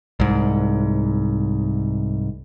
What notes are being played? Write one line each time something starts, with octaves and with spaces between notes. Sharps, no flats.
C2 G#2